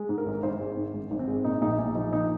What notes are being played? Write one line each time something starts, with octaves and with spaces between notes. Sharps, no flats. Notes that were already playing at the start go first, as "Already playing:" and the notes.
Already playing: G#3
G#2
A#4
G#1
G#1 C5
G#3
G#2
G#1
G#1
C4
G#3
A#2 D#4
A#1 D#4
A#1 D#4
F3 D#4
A#2 D#4